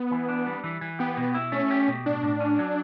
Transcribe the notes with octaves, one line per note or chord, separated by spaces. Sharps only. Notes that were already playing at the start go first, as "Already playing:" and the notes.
Already playing: B3
E3
D4
G3
E3
E3
B3 G4
B2
E4
A3 C#4
G4
B2
A2 D4
A2
C#4
F#3